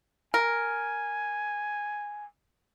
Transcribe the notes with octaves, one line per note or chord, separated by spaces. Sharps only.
A#4 G#5